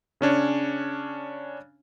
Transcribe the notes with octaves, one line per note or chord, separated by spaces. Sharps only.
C#3 C#4 D4 C#5